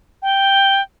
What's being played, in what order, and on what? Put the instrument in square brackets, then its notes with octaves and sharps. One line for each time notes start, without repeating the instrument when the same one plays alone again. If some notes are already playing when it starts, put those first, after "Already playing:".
[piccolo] G5